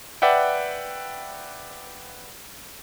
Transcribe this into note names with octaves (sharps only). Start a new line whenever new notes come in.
B4 D5 E5 F#5 G5